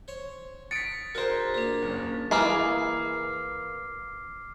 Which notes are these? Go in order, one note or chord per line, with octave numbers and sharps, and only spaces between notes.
C5 C#5
D#6 A6 B6 C#7 D7
D#4 F#4 G#4 A#4 C5 G#5
A#2 A#3 D4 G#4
F#1
E3 A#3 G#4 D6 F6 C7